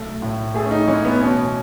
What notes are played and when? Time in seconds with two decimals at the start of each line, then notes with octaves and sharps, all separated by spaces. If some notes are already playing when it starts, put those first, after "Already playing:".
Already playing: B1 A3
0.22 A2
0.54 A3 G#4
0.65 C#4
0.71 D#4
0.88 E3 C#4
1.05 B3
1.21 B2 C#4